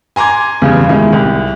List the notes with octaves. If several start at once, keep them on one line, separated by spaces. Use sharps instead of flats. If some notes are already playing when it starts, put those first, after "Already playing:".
G#5 A#5 C6 D6 G#6
E2 G2 C#3
D#3 G#3 E4
C2